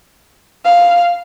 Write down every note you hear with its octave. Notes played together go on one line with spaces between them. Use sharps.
F5